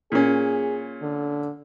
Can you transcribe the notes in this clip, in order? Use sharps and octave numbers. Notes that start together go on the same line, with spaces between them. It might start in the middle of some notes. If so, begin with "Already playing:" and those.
A#2 C#4 G#4
D3